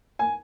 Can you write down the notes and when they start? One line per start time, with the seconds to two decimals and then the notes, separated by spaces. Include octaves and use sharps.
0.19 G#5